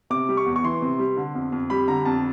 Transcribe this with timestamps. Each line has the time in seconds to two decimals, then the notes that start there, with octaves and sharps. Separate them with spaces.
0.10 C3 D6
0.29 G3
0.37 C#6
0.46 E2
0.56 C#6
0.64 E3 C6
0.82 C3
0.99 G3
1.17 D3
1.35 F2
1.52 F2
1.70 G3 B5
1.88 D3 A#5
2.05 F2 A5